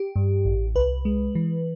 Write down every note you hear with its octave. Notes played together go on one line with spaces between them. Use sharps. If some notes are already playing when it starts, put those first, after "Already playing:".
Already playing: G4
G2
A1
C2 B4
G#3
E3